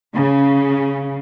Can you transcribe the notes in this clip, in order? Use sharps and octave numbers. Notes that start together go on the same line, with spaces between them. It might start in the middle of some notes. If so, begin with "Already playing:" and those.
C#3